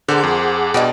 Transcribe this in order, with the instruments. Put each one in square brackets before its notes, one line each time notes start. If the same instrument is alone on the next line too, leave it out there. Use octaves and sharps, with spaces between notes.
[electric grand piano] D3 [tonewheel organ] G#4 F#5 D6 [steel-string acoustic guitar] A#4 C5
[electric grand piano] F2
[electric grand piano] B2 [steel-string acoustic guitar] G3 G#3 D4